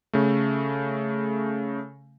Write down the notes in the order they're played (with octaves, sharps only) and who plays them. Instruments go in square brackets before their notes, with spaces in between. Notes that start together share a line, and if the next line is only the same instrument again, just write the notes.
[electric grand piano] C#3 A3